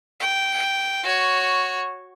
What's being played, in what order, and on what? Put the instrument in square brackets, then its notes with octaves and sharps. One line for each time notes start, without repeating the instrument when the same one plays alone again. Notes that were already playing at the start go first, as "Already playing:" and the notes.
[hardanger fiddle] G5
F#4 C#5